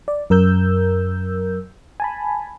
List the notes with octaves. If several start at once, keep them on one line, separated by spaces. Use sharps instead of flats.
D5
F#2 A#4 E6 G6
G#5 A5 B5